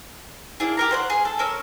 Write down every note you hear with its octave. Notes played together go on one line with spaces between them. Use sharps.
A#3 D4 E4 G#4
G4 A#4 A#5
C5 C#5 F#5
G#4
A4
C#4 A#4 E6